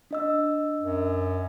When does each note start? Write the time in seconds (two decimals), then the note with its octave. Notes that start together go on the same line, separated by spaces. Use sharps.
0.11 D4 D#5 E6
0.81 F#2